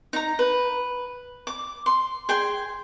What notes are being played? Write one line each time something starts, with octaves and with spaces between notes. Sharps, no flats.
D#4 A#5
B4
D6
C6
G#4 G5 C6